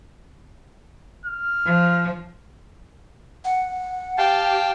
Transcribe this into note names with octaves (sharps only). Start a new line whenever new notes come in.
F6
F3
F#5
G4 F5 G5 A5